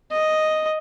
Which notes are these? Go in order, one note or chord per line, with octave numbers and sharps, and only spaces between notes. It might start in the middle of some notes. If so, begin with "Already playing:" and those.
D#5